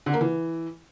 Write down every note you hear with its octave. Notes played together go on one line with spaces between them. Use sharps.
D3
A#3
E3